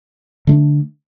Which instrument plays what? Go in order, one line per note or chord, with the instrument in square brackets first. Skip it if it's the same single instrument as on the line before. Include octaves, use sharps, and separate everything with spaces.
[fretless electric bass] D3 A3 D4